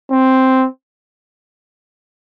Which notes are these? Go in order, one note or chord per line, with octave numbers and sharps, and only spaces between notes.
C4